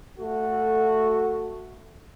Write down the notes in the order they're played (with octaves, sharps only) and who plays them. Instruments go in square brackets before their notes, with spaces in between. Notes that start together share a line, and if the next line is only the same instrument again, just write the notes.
[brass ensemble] A3 F#4 A4